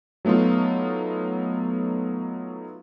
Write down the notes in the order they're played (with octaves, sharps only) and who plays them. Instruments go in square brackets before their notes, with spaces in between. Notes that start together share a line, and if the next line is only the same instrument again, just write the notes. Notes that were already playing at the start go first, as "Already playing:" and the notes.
[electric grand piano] F#3 A3 B3 D#4 F4